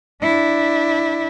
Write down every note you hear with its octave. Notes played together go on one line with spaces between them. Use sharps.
D4 E4